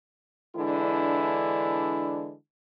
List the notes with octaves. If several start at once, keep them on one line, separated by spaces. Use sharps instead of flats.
D3 E3 G#3 D4 E4